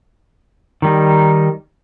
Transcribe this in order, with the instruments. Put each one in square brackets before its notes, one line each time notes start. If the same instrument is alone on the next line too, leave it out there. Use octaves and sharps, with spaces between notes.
[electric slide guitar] D#3 G3 D#4